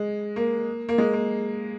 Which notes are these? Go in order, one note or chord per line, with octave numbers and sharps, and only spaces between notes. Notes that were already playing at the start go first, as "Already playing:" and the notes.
Already playing: G#3
A#3
A#3
G#3
A#3